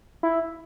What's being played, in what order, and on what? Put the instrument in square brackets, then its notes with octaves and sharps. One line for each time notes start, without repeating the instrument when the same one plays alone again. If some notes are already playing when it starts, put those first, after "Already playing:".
[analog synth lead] E4